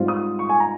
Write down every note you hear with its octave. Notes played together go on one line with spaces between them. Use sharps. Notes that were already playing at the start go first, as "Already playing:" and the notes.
Already playing: G#2 G3 C4 F4
D#6
C#6
G#5
A#5